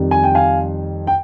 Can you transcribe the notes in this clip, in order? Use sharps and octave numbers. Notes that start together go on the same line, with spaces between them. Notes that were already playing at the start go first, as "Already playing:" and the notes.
Already playing: F2 D#3 G3
G#5
G5
F5 G#5
G5